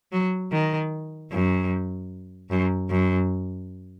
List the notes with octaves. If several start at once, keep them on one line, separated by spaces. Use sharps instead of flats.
F#3
D#3
F#2
F#2
F#2